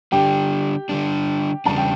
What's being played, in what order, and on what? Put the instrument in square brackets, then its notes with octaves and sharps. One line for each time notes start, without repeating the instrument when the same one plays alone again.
[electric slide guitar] D3 G3 D4 [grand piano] G4 G5
[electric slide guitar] D3 G3 D4
[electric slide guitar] E2 C#3 G3 D4 [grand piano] A5
[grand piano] G5